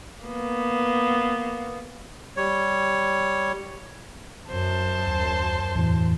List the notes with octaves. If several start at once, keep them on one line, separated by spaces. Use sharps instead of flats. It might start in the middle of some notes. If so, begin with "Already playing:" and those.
A#3 B3
G3 C#5
F#2 C5 A5
D#2
E2 A2 E3